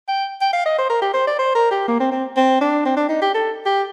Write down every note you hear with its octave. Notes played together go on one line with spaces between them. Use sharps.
G5
G5
F5
D#5
C5
A#4
G4
C5
D5
C5
A#4
G4
A#3
C4
C4
C4
D4
C4
D4
D#4
G4
A4
G4